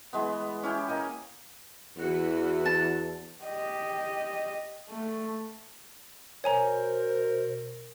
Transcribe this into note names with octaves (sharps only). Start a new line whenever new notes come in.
E3 G#3 B3
C#4 E4 G4
A#3 D#5 G#5
E2 E3 F#4
A5
G4 D#5
A3
B2 A#4 C5 C#5 G#5 A#5